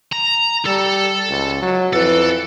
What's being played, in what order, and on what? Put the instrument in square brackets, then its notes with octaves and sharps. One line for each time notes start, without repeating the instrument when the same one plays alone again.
[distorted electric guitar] A#5
[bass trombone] G3 [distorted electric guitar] A4
[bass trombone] C#2
F#3
[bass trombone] F2 [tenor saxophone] E3 [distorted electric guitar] A4